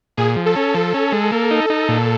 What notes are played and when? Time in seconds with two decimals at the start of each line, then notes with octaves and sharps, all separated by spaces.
0.17 A#2 G#4
0.36 F3
0.46 A4
0.56 C#4
0.74 F3 A4
0.94 C#4
1.12 G#3
1.32 A#3
1.51 D#4
1.70 D#4
1.88 A#2